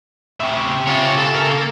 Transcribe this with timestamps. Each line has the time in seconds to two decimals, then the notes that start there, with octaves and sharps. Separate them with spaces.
0.40 A2 C#3 G4 E5
0.87 C#3 F4 C#5
1.18 A4
1.35 A#4
1.49 A#3